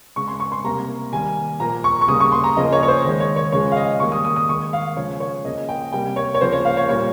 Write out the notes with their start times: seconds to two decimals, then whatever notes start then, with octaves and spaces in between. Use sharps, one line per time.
0.16 C#3 G#3 C#6
0.28 C6
0.40 C#6
0.52 C6
0.64 C3 G3 A#3 A#5
1.12 D#3 G3 A#3 G#5
1.60 A#2 F3 A#3 A#5
1.84 C#6
2.01 C#6
2.08 C#3 G3 A#3 D#6
2.20 C#6
2.32 C6
2.44 A#5
2.57 C#3 F3 A#3 D#5
2.72 C#5
2.83 C#5
2.88 C5
3.05 D#3 G#3
3.20 C#5
3.36 C#5
3.52 C#3 F3 G#3 C#5
3.72 F5
3.76 D#5
4.00 D#3 G3 A#3 C#6
4.12 D#6
4.25 D#6
4.36 D#6
4.49 D#3 G#3 C#6
4.73 F5
4.97 C#3 F3 G#3 C#5
5.20 C#5
5.45 C#3 F3 A#3 D#5
5.69 G5
5.92 C3 G3 A#3 G5
6.16 C#5
6.34 C#5
6.41 C#3 F3 A#3 C5
6.52 C#5
6.65 F5
6.77 C#5
6.89 A#2 G3 A#3 C#5